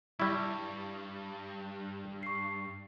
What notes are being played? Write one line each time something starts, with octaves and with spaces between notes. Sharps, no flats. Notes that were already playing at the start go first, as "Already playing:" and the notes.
G2 G3 E4 C#6
C#6 C7